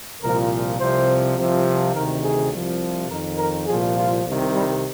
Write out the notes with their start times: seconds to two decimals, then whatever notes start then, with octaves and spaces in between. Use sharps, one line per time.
0.22 C2 A#2 F3 A#4
0.79 C2 C3 F3 C5
1.37 C2 C3 F3
1.94 D2 C3 D#3 A#4
2.23 G#4
2.53 C2 C3 F3
3.10 F2 D#3 A#4
3.38 A#4
3.67 C2 A#2 F3 G#4
3.96 F4
4.25 C2 C3 D#3
4.54 G3